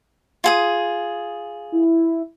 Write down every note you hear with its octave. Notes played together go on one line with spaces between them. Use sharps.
F4 G#4 D#6
E4